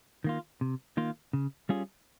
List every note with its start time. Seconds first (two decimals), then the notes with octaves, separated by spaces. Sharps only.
0.24 D#3 A#3 F4
0.61 C3
0.97 D#3 A#3 F4
1.33 C#3
1.69 G3 C#4 F4 G#4